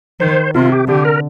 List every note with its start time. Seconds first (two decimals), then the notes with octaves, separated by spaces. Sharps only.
0.20 D#3 C5
0.55 C3 F4
0.72 G4
0.88 D3 G4
1.05 A#4